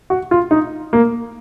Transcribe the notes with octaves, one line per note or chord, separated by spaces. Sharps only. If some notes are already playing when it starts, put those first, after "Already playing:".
F#4
F4
D#4
A#3